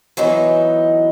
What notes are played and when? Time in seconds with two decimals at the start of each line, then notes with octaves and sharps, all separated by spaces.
0.17 E3 F#3 B3 D#4